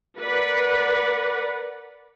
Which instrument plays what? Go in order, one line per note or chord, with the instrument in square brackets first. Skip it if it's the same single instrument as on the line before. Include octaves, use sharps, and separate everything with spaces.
[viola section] A#4 B4 D5 F#5